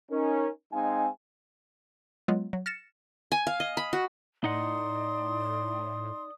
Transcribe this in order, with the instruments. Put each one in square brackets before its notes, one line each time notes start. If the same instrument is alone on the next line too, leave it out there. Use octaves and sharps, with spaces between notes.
[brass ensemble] C#4 D#4 A#4
G#3 C4 D#4 F5 G#5
[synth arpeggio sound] F#3 G#3 B3 F4
F#3
F6 A6 A#6 C#7 E7
[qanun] G#5
F5
D#5
B5
F#4
[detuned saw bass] A2 [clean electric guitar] D#4 D#5 F#5 [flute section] D5 D#6 [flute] C6